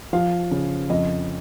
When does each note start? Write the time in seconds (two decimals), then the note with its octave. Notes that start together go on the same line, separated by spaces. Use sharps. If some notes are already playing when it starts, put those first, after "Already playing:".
0.13 F3 F5
0.51 C#3
0.90 F2 D#5